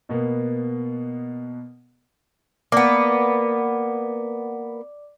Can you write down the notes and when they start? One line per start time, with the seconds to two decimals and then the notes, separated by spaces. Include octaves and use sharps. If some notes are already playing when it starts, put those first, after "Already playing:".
0.09 B2 A#3 B3
2.72 A#3 B3 D5 D6